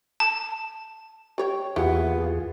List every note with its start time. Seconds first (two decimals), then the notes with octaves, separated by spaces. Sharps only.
0.20 A5
1.38 G3 C#5 G5
1.76 E2 A#2 B3 E4 F4 G4 G#4